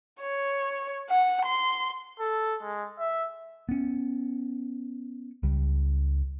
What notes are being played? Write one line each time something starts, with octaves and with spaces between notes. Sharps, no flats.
C#5
F#5
C6
A4
G#3
E5
B3 C#4
C#2 G3